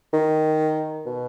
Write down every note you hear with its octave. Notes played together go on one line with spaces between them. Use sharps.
D#3
B2